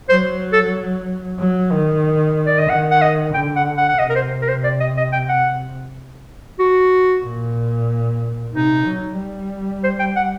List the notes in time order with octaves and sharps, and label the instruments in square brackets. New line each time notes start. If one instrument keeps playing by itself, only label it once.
[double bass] F#3 [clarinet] C5
[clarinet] A4
[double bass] F#3
D#3
[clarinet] D5
D#5
[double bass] D#3 [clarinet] F#5
[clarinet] F#5
D#5
[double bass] D3 [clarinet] G5
[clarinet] F#5
F#5
F#5
[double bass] C3 [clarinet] D#5
[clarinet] A#4
C5
A#4
C5
D5
D#5
D#5
G5
F#5
F#4
[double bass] A#2
[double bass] C3 [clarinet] D#4
[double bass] F#3
G3
[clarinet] C5
G5
F#5